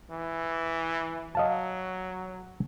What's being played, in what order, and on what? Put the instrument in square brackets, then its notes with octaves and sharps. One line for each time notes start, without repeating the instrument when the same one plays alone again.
[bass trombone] E3
[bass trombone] F#3 [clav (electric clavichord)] D#5 F5 A5